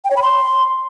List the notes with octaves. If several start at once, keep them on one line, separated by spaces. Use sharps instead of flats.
G5
C#5
B5
C6